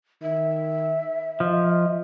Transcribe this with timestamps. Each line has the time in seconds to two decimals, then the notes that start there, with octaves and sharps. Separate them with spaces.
0.22 D#3 E5
1.40 F3 D#5